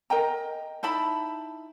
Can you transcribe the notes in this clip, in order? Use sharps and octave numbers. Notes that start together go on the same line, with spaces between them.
A#4 D#5 G5 A#5
D#4 E4 A5 B5